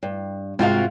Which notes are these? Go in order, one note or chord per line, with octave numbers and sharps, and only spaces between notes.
G2
G#2 C3 F4 F#4 F5